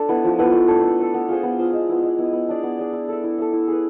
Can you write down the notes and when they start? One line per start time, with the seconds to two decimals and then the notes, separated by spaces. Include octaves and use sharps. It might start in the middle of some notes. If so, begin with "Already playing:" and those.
Already playing: D4 A4
0.09 B3 E4 B4
0.24 F3
0.38 B3 E4 B4
0.53 A3
0.68 D4 A4
0.84 A3
0.99 D4 A4
1.14 B3
1.28 F4 G#4 C5
1.43 B3
1.59 F4 G#4 C5
1.73 G#3
1.89 B3 E4
2.03 G#3
2.18 B3 E4
2.33 B3
2.48 D4 G#4 D5
2.63 B3
2.79 D4 G#4 D5
2.93 E4
3.09 A4 E5
3.24 E4
3.38 A4 E5
3.53 E4
3.68 G#4 B4